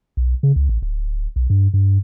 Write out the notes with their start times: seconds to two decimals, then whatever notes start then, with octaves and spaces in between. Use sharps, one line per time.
0.17 B1
0.43 C#3
0.56 C#2
0.69 A1
0.82 D1
1.36 B1
1.50 G2
1.74 G2